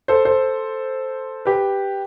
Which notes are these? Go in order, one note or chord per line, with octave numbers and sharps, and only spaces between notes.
A4 C5
A4 C5
G4 B4